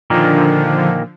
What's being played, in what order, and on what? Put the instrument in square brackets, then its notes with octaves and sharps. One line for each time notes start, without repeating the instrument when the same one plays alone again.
[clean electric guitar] A#2 D#3 A#3 [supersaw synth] D3 F3